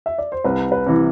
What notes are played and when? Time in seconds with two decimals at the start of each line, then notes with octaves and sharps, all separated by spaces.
0.06 E5
0.18 D5
0.32 C5
0.44 C2 B4
0.72 B4
0.87 C3 E3